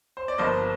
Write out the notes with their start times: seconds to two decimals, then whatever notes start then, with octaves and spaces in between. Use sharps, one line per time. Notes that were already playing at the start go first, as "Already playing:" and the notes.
0.17 C5
0.28 D5
0.38 G1 G2 F3 A#3 C5 D#5